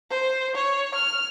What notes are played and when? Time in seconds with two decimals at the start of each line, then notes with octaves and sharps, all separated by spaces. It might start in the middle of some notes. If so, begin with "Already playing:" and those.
0.11 C5
0.55 C#5
0.94 F6